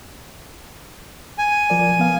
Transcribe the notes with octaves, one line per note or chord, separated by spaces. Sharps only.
G#5
F3 A#4 D5
F3 B3 F5